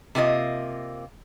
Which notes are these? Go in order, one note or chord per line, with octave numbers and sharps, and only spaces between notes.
C3 A#3 F4 D#5